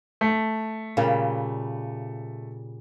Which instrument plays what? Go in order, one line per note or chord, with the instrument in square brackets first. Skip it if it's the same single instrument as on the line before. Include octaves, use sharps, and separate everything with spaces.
[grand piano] A3
[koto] A#2 C#3 G3